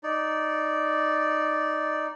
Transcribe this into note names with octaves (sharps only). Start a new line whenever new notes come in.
D#4 D5